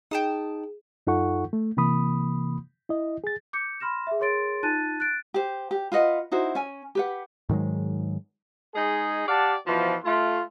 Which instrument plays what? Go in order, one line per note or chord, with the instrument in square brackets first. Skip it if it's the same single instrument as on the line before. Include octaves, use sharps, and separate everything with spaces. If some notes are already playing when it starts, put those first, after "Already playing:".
[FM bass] D#4 [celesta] G#4 [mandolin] G5 A5 D#6
[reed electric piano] F#2 D#4 F4 A4 F#5 C#6
A3
C3 E3 A#3 B5 D#6
E4 D#5
G#4 A6
[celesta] D6 G6 C#7
B5 C6 F6 A#6 E7
G#4 E5
G#4 A#4 C#5 C6 A6 D7
D#4 F4 A5 F#6 A6 D#7
F#6 A6 D7
[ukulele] G4 C5
G4
F4 B4 D#5 F#5
D#4 E4 F#4 C5
C#4 G#5
G4 B4 F#5
[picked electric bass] G#2 D#3 F#3 G#3
[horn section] G#3 D#4 G#4
G4 D5 F5 F#5 A5
B2 E3 F3
A3 F4